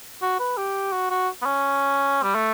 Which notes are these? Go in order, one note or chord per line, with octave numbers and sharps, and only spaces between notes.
F#4
B4
G4
F#4
F#4
B3
C#4
G3
A3